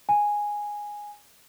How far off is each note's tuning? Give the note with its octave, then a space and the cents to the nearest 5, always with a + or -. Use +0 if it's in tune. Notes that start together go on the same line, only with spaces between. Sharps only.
G#5 -5